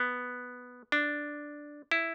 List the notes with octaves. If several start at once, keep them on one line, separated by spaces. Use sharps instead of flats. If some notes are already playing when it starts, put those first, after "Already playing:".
Already playing: B3
D4
E4